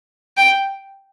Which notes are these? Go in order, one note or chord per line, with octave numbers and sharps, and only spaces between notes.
G5